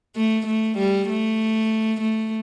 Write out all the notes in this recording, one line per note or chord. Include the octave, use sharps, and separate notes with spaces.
A3
A3
G3
A3
A3